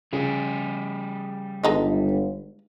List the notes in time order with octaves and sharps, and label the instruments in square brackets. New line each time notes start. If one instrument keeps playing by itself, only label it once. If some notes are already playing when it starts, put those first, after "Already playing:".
[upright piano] C#3 [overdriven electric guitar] G3 G#4
[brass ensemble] G1 [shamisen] G#3 D#4 A4